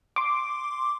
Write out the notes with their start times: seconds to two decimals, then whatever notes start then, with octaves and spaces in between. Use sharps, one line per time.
0.16 C6 D6